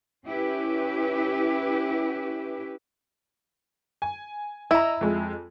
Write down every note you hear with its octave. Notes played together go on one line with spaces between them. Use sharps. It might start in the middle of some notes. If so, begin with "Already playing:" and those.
C#4 E4 G4 B4
G#5
E4 D#5 E5 A#5
F2 G#3